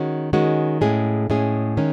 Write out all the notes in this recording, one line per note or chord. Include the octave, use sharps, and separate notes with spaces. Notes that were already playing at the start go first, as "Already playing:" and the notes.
Already playing: D#3 G#3 C#4 F#4
D#3 G#3 C#4 F#4
A2 G#3 C#4 G#4
A2 G#3 C#4 G#4
D#3 G#3 C#4